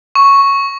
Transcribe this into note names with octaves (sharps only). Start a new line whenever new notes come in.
C#6